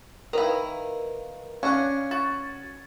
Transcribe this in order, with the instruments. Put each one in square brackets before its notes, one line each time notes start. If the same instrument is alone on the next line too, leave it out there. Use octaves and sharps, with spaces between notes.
[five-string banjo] D#3 E4 [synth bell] A#4 B4 F5
[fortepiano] C#4 [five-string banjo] D4 F#5 [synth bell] F5 C#6
[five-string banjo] F#4 [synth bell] A6